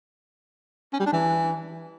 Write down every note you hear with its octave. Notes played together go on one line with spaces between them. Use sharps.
C#4
G3
D4
E3